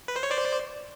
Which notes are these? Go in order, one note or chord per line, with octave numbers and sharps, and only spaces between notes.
B4
C5
C#5
C5 D5